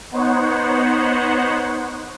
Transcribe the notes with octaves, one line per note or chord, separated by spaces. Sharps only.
B3 D#4 C5 C#5 F#5